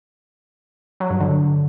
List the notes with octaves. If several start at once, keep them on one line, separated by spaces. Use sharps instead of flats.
F#3
G2
D3